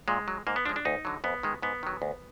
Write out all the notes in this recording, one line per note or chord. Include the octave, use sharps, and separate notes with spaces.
A#2 G#3
F#3
G#2 A#3
B3
F3 G#3 D4
D4
D2 D#4
D3 F#3
F2 B3
D#3 G#3
G#2 B3
D#3 F#3
D2